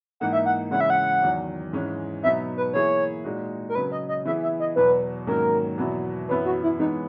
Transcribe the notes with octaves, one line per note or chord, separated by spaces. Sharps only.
G#2 E3 A#3 D#4 F#5
E5
F#5
C#3 E3 G#3 C#4 E4 F#5
E5
F#5
E2 D#3 F#3
G#2 E3 G#3 C#4
B2 F#3 B3 D#4 E5
B4
E3 A#3 E4 G#4 C#5
A#2 G#3 D#4 F#4
A#4
C#3 F#3 C#4 B4
D#5
D#5
E3 B3 E4 G#4 E5
E5
D#5
E2 B2 F#3 B4
G#2 D#3 F#3 A#3 C#4 A#4
E2 B2 F#3 B3 E4
F#2 E3 B3 E4 B4
F#4
E4
E3 G#3 B3 D#4 E4